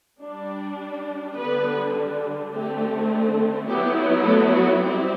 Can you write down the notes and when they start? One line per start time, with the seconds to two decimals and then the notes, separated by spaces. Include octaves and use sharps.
0.20 G3 D4
1.36 D3 G3 B3 D4 B4
2.52 D3 A3 C4 G4
3.67 F#3 B3 E4 G4
4.25 A3 A4
4.54 F#4
4.83 G3 C4 E4 G4